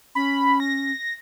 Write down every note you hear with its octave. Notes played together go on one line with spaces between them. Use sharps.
C#4 B5
A#6